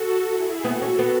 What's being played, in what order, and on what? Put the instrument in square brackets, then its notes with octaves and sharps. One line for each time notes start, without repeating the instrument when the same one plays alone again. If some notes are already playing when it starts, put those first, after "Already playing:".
Already playing: [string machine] F#4 A4
E4 G#4
[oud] B3 [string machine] F#4 A4
[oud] C#4
B3